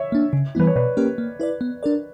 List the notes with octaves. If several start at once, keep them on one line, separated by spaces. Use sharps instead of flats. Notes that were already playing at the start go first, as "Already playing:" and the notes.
Already playing: C#5 E5
A#3 D4
C#3
E3 G3 B3 E4 B4
C#5
B2 B4 D5
A#3 C#4 G4 A#4
A#3
E4 B4 D5
B3
D4 A#4 D5